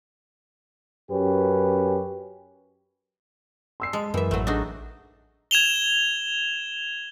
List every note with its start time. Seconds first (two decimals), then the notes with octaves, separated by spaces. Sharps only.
1.10 F#2 C#4 G4 B4
3.80 C6 E6 C7
3.93 G#3 A5
4.14 F#2 E3 A#4 E5
4.31 A1 F#3 A3
4.47 D4 D#4 F#4 G#4
5.51 G#6 E7 F7 G7